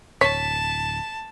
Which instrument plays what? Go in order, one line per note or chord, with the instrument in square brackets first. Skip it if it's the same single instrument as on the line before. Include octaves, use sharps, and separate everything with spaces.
[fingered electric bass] D1 [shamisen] C#5 [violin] A5 [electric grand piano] B6